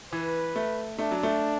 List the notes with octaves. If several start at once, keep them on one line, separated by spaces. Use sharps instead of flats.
E3 B4
A3
A3 D4
F#3
A3